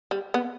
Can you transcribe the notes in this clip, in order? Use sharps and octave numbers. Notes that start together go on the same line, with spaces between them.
G3
B3